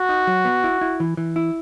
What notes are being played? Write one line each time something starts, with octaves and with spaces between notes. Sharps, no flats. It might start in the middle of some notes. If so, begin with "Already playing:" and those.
Already playing: F#4
D#4
F#3
B3
E4
E4
E3
E3
E4